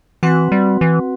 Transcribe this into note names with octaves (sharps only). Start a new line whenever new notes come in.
E3 C4 F#4 B4 F#5
G3
E3